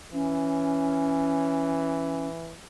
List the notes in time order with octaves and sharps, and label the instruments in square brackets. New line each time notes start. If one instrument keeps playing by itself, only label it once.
[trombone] E3 [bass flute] C#4